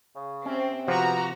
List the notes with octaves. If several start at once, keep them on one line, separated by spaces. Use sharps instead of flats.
C#3
C3 C4 C#4
C3 F3 B3 F#4 A#5